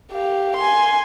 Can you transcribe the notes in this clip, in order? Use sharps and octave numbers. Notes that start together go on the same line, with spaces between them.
G4 F5
G#5 C6